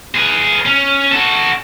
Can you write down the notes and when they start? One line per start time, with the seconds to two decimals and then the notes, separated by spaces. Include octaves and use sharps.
0.15 G#4 B4
0.65 C#4
1.12 F#4 A4